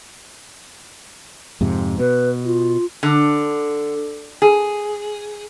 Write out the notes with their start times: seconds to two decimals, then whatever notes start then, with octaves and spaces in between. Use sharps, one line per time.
1.61 F2 G#2 C3
1.99 B2 B4
2.45 F4
3.03 D3
4.42 G#4